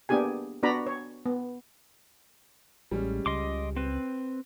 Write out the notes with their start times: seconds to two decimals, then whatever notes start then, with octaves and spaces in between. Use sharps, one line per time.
0.09 A#3 B3 D4 G4 G#4 G#5
0.63 B3 D4 F#4 D5 A#5 B5
0.86 C#5
1.26 B3
2.91 A1 G3 G#3 C#4
3.26 C#2 D#5 C6 D6
3.77 C4 B4